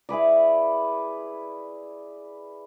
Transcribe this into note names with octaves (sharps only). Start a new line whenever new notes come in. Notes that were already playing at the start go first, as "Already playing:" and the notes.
E4 G#4 B4 D5